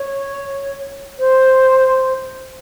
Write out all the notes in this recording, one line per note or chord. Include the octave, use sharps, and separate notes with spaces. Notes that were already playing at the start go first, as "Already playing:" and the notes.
Already playing: C#5
C5